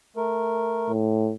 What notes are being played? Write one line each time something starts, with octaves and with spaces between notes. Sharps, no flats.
A3 A#4
A2